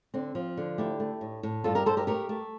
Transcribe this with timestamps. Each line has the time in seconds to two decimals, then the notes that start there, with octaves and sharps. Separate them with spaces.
0.14 D3 C4
0.35 F3
0.57 D3
0.78 A3 E4 G4
1.00 A3
1.21 A2
1.43 A2
1.64 G2 F4 A4
1.75 G4 A#4
1.86 G2 A4 C5
1.97 G4 A#4
2.07 A3 G4 A#4
2.29 A3